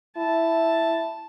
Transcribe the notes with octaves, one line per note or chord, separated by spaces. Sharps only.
E4 A5